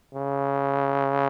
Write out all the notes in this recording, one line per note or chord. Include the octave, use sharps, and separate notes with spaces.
C#3